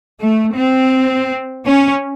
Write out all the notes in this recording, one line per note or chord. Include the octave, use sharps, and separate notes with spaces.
A3
C4
C#4